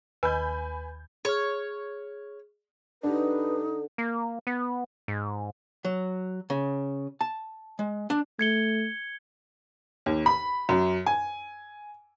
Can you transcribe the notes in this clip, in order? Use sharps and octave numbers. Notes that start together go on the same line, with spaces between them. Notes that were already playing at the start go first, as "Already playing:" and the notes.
D#2 B4 G#5 B5 G6
G#4 C#5 F6
D3 D4 D#4 G4 B4
A#3
B3
G#2
F#3
C#3
A5
G#3
D4
A3 G#6 C#7 G7
D#2
B5
F#2
G#5